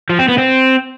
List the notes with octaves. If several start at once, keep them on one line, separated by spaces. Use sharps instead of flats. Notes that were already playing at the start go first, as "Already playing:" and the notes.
F3
C4
B3
C4